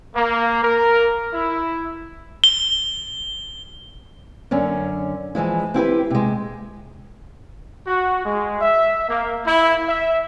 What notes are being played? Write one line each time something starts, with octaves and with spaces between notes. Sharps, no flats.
A#3
A#4
E4
G7
F#2 D3 C#4
E3 F3 G#3 E4
C4 E4 G4 B4
C3 G#3
F#4
G#3
E5
A#3
E4
E5